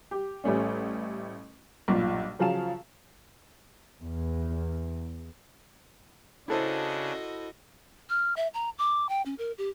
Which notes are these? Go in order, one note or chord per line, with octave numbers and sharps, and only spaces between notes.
G4
A1 G3 A3 C#4
B1 G2 A#2 F4
C#3 F3 F#3 F5 A5 E7
E2
C#3 D4 E4 F#4 A4 C5 D#5
F6
E5
A#5
D6
G5
C#4
A#4
G4